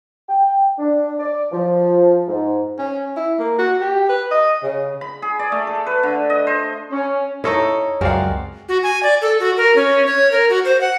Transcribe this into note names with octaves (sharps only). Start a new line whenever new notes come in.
G5
D4
D5
F3
G#2
C#4
E4
A#3
F#4
G4
B4
D#5
C#3
B5
G#4
D5
A3
A4
B4
D3
D#5
C5
C#4
D#4 E4 A4 C#5 D#5 C#6
C#2 F#2 G#3 C4 F#4 A#4 D5 F5
F#4
G#5
D5
A4
F#4
A#4
C#4
C#5
A#4
F#4
C5
F#5